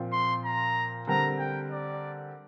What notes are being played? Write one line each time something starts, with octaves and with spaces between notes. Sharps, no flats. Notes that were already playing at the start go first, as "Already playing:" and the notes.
Already playing: A#2 F3 C4 F4
C6
A#5
D3 G3 C4 A#4 A#5
G5
D5